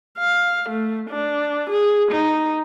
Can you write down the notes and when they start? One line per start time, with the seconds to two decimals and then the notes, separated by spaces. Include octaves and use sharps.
0.18 F5
0.69 A3
1.10 D4
1.70 G#4
2.12 D#4